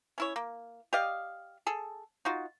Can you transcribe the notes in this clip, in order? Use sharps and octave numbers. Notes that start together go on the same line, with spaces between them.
C#4 E4 C#5
A#3
G4 D5 D#5 F5
G#4 A4
D#4 F4 F#4